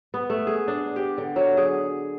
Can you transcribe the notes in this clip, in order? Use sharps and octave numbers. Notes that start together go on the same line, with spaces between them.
B3
A3
G#4
D4
G4
D3
F#3
G#4